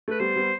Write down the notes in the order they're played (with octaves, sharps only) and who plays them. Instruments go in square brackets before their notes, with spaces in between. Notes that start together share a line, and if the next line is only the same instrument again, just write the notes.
[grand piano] A3 [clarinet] B4
[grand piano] G3 B3 [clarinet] C5
[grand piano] G3 B3